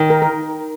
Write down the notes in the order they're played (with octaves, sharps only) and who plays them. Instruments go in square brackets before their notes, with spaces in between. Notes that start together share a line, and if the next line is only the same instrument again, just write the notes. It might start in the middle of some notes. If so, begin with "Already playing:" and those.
Already playing: [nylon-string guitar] D#3
[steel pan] A#4
A#4